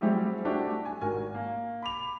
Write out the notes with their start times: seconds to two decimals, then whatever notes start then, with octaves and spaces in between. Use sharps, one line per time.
0.01 F#3 G3 C4 E4 G4 G#4
0.45 A3 D4 E4 F#4 G4
0.85 G#5
1.01 G#1 F#4 A#4 G#5
1.34 A#3
1.82 B5 D6 F7